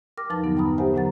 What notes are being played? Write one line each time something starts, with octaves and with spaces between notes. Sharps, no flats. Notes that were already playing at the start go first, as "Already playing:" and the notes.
A#4 G5 D6 F6 A#6
E2 F3 D#4 B4 A5 A6
G2 D3 F#3 B3 D#4
G5 A#5 B5 D#6
G4 A#4 C5 E5 F#5 G#5
A2 D3 F#3 F#5 A#5 A6